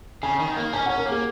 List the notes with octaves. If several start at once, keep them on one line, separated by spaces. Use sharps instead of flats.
C#3 G#5
D#3
A#3
C#4 G#5
F#5
C#4
A#4
A#3 G#4